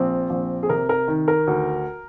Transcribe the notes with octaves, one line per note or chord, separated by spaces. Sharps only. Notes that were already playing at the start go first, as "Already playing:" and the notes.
Already playing: A#1 C4
A#1
G#4
C3 A#4
A#4
D#3
A#4
D2